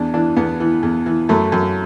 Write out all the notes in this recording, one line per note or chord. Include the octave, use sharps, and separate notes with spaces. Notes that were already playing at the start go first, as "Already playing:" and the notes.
Already playing: E2 D4
E3 D4
E2 B3
E3
E2
E3
F#2 A3
F#2